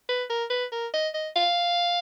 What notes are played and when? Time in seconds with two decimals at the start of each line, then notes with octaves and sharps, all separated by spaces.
0.09 B4
0.30 A#4
0.50 B4
0.72 A#4
0.94 D#5
1.14 D#5
1.36 F5